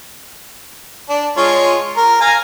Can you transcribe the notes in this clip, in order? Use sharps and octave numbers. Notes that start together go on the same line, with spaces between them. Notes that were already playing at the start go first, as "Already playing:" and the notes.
D4
G#3 F4 C#5
A#4
F5 G#5 A#5